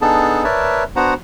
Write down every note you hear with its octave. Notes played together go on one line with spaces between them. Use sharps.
B3 D4 D#4 G#4 A4 A5
A#4 B4 C#5 D5 E5 A5
B3 D4 F#4 C5 F#5 A#5